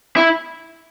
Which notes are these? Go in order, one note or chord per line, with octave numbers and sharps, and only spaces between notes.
E4